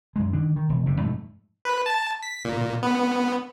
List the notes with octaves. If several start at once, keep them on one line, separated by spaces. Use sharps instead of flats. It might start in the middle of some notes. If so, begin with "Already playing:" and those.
F#2 G#3
D#3 D4
D#3
E1
F#1 C3
F2 G#2 B2 A3
B4
A5
B6
A#2
B3